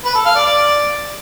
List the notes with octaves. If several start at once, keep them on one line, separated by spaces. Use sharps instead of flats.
B4
A4
F5
D5
D5